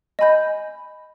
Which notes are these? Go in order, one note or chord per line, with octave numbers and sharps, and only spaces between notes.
D#5 G#5 B5 G6